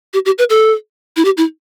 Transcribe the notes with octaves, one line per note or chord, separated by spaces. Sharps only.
G4
G4
B4
A4
E4
G4
E4